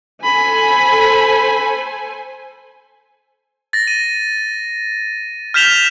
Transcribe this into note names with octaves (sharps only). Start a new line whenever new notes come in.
A4 C5 G#5 B5
A6 A#6
D#7
F6 G6 B6 E7 F7 G7